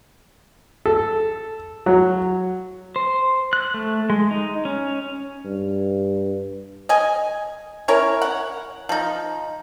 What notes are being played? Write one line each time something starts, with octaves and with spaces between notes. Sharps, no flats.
A4
F#3
C5
F#6
A3
G#3
D#4
C#4
G2
D#5 G#5
C#4 E4 A#4 C#5
F#5
F3 D#4